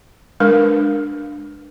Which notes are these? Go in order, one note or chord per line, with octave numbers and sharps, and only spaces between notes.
G#3 D4 A#4 B4